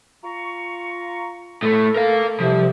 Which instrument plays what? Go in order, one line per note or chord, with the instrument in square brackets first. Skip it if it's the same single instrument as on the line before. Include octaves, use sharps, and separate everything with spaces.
[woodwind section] F4 A#5 C#6
[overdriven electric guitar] A2 A3 [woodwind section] A4
[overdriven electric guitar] A#4 F5
[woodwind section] C2 G3 [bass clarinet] C3 [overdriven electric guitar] F3